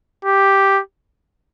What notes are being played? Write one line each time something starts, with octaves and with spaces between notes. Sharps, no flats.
G4